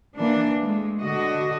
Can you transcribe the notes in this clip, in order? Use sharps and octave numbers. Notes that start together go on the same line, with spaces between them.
E3 A#3 D4
G#3 A3
D3 F#4 D#5